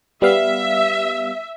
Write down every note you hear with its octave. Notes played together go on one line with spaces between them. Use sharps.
G3 B3 E5 F5